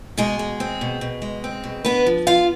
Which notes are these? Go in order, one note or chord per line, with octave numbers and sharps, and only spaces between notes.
B2 G#3 G#4
G#3
C4
B2
B2
G#3
C4
B2
B3 D4 B4
F3
B3 F4 F5